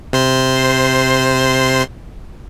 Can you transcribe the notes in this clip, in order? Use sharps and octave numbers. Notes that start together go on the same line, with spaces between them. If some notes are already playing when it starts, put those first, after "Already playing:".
C3 C5 C6